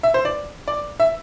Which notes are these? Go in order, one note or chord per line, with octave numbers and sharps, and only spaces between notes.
E5
C5
D5
D5
E5